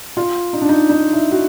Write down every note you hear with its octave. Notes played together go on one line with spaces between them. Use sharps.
F4
D#4
D4
D#4
D#4
E4
F#4